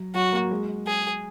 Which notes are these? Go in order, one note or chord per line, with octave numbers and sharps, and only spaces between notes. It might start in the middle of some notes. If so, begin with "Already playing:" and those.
Already playing: F#3
F#3 F#4
A#3
G#3
G#4